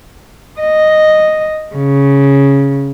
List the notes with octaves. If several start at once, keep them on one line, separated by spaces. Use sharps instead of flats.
D#5
C#3